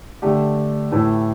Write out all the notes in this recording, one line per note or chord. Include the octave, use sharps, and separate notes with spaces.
D3 A3 D4 G4
A2 E3 A3 E4